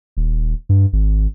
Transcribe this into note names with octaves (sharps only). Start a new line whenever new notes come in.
D#1
G2
G#1